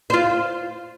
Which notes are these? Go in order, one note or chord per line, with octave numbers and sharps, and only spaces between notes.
F4 C5